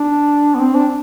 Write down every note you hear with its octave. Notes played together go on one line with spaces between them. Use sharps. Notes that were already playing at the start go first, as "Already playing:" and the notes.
Already playing: D4
B3
C4
D4